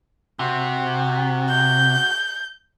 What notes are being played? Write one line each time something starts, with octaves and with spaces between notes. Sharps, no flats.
C3 F#4
G6